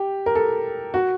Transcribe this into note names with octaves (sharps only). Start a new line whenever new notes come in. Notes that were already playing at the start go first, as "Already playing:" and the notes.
Already playing: G4
A#4
A4
F#4